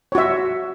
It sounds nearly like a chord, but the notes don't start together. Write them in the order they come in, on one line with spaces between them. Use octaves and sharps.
C#5 F#4 E5